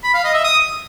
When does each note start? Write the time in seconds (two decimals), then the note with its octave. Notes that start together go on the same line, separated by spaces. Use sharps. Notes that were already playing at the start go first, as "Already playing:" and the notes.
0.04 B5
0.14 F5
0.24 D#5
0.34 E5
0.44 D#6